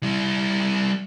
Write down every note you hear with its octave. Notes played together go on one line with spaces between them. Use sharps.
G3 E4